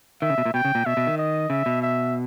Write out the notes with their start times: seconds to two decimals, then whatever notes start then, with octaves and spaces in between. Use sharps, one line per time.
0.22 D#3 E5
0.30 C#3
0.38 B2
0.45 A#2
0.54 B2 G5
0.65 C#3
0.75 A#2
0.86 B2 E5
0.97 B2
1.07 D#3
1.18 D#5
1.50 C#3 E5
1.66 B2
1.82 E5